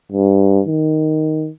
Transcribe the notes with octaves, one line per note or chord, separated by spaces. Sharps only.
G2
D#3